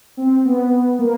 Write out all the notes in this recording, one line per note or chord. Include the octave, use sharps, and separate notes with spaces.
C4
B3
A#3